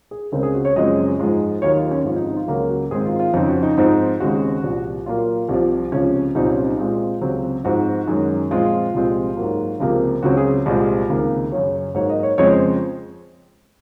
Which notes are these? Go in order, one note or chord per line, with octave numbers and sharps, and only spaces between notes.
G#4
C#2 C#3 G#3 C4 A#4
G#4
F#4
C#5
F#2 C#3 F3 G#3 C4 D#5
G#2 F3 G#3
D#2 D#3 F#3 C#5
F4
C#4
G#2 F3 C4 C#4
D#4
D#4
F4
C#2 C#3 F#3 A#3 F#4
F#4
G#2 D#3 G#3 C4 G#4
F4
F4
F2 C#3 F3 C4 D#4
F#4
D#4
G#2 F3 C4 D#4
D#2 C#3 G#3 C4 F#4
C2 A#2 F3
A#2 F#3 A#3 F4
C2 C3 F3
C#2 C3 F3 C#4
C2 A#2 F#3 C4 D#4
C#4
D#4
A#2 G#3 C4 F4
C#2 C3 F#3 C4
G#2 F3 C4 F#4
F#2 D#3 G#3
A#2 F3 G#3 C4 F4
C2 A#2 F3 G#3 C4
G#2 F#3 A#3
C#2 C3 F3 A#3
C#2 C#3 F#3 C4 F#4
G#4
C2 A#2 G#3 C4
C#2 C3 D#3 A#3
F#2 C#3 F#3 C#5
G#2 F#3 A#3 C#5
D#5
C#5
F2 C#3 F3 G#3 C4 C#5
C5